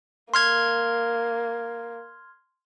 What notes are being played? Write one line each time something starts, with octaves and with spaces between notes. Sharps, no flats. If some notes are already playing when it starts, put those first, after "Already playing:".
A#3 C6 F6 G#6